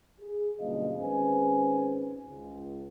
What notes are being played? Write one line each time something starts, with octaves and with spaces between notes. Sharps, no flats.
G#4
G1 F#2 B2 A#3 D#5 F5
G#1 C#4 G#4 B4 C5 G#5
C#2